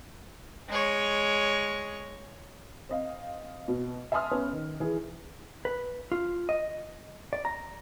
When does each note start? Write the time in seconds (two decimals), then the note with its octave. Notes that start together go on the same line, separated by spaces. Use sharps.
0.69 G#3 C#5
2.89 C4 D#5 F5
3.68 B2
4.12 E5 G#5 A5 C6 D#6 F6
4.31 B3 C#4 B4
4.53 D#3
4.80 E3 G#4
5.65 B4
6.12 F4
6.49 D#5
7.33 D5
7.45 A#5